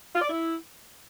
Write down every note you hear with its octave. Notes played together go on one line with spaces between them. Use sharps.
F4
D5
E4